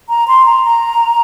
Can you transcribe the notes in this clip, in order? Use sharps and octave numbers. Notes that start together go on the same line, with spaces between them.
A#5
C6
A#5
A#5